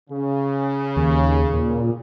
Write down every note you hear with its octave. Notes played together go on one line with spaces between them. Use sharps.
C#3
D#2
A#2